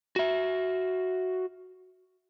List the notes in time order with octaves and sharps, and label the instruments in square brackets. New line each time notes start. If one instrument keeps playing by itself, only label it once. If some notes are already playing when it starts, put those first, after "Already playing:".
[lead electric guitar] F#4 E5